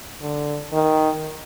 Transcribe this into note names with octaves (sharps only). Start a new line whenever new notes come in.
D3
D#3